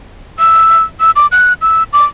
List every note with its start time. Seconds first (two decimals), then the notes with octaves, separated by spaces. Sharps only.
0.39 E6
1.00 E6
1.16 D6
1.32 F#6
1.62 E6
1.93 D6